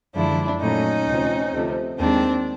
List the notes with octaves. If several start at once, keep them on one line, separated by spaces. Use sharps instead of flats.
F#2 D3 F3 G#3 D4 E4
A#2 F#3 A3 C#4 D#4
D2 C3 F3
D2 C3 F3 A3
D#2 D#3 G#3 C4 D4